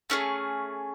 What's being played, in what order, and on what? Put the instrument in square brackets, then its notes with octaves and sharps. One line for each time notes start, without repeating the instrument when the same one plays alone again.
[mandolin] A3 C#4 G#4